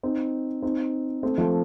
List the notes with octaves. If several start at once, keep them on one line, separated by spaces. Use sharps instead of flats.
C4 D#4
C4 D#4
A3 C4
F3 A3